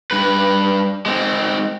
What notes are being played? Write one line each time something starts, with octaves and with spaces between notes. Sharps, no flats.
G2 B4
G#3 C4